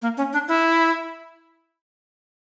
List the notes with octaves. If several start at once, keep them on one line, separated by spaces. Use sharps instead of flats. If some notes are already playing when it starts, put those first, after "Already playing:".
A#3
C#4
D4
E4